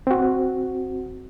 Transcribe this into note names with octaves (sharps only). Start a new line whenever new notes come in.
C4 F#4